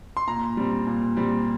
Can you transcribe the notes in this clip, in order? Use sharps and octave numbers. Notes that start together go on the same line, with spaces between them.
C6
A#2 A#5
G3 C4
A#2
G3 C4